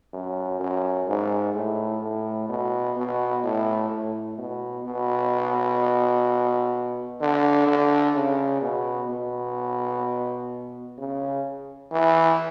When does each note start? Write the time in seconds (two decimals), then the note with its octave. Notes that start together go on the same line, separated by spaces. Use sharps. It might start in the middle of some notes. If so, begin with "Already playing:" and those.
0.13 F#2
0.60 F#2
1.08 G#2
1.54 A2
2.02 A2
2.49 B2
2.97 B2
3.44 A2
3.91 A2
4.38 B2
4.85 B2
7.21 D3
7.67 D3
8.15 C#3
8.62 B2
9.10 B2
10.98 C#3
11.92 E3